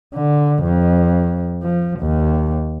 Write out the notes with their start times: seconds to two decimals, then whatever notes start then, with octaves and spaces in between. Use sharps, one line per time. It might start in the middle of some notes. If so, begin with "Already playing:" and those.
0.14 D3
0.63 F2
1.63 F3
2.00 D#2